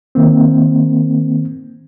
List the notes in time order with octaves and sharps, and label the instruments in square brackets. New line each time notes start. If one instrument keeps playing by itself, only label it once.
[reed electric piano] D#3 A#3 C4